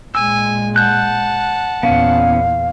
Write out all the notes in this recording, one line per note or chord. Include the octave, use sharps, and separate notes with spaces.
A#2 G#3 G#5 E6
F#5 A5 F#6 G6
E2 A#2 B3 C#4 F5